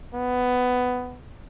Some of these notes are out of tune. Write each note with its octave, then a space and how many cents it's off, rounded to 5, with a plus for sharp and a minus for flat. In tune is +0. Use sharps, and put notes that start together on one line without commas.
B3 +10